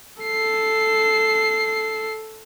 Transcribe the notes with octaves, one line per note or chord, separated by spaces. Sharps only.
A4 C7